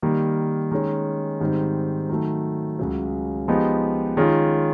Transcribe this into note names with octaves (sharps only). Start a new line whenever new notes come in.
D#3 G3 A#3
D#3 G#3 C#4
G#2 D#3 G3 C4
D#3 F#3 A3
C#2 C#3 F#3
F3 G#3 B3 D#4 G4
D#3 G#3 C#4 F4 G#4